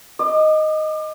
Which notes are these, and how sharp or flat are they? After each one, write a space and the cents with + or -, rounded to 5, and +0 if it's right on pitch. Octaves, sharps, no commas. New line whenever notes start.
D#5 +0 D6 +35